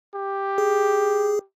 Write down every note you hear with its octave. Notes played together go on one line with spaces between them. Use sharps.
G4
G#4